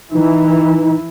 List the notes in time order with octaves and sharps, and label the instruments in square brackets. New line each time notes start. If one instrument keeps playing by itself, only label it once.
[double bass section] E3 [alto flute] D#4